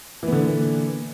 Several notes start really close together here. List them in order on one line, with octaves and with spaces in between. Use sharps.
E3 B3 D3 A#2